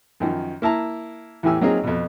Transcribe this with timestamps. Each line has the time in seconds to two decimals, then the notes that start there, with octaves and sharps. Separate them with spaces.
0.20 F#2 D#3 F3
0.62 A#3 E4 A5 A#5
1.43 E2 A2 E3 G4 G#5 E6
1.61 F#3 A#3 C4 D#4 F4 G#4
1.84 F2 B2